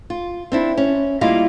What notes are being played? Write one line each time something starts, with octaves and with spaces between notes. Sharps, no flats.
F4
C4 D4 E4
C#4
G3 A#3 E4 F4 D#5 F5